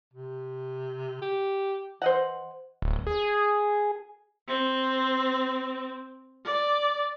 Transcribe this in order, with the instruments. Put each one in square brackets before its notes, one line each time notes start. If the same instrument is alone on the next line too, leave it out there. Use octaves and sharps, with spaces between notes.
[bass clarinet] C3
G4
[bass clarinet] E3 [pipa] C5 D#5 F#5
[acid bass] D1
G#4
[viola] C4
D5